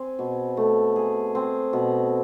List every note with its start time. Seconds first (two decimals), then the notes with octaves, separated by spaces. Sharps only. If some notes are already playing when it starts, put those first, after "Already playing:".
Already playing: C4 G#4
0.19 B2
0.57 A3
0.96 G#4
1.35 C4
1.73 B2